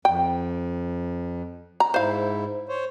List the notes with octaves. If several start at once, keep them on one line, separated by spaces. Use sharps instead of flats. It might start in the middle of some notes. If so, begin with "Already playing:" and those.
F2 G5
A#5
G#2 E4 C5 F5
C5 C#5